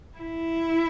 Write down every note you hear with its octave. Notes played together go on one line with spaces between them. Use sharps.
E4